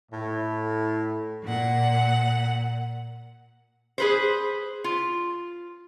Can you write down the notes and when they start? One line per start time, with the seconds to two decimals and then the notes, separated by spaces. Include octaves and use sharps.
0.12 A2
1.44 A#2 F#5
3.98 G#4 B4 C5
4.84 F4